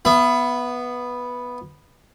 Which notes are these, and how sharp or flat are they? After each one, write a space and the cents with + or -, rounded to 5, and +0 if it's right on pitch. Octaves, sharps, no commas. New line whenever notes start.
B3 -5 E5 +30